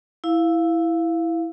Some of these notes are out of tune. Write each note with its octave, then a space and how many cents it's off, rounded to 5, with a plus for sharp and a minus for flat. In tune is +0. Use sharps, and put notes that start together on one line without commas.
E4 +0 F5 +0